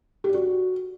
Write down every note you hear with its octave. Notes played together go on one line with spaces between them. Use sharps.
G4
D5
F#4